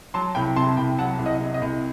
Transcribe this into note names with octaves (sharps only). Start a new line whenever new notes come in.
F#3 A5 C6
C2 G5 B5
C3 A5 C6
C2 G5 B5
F#3 F#5 A5
C2
D#5 F#5
C3
D#5
C2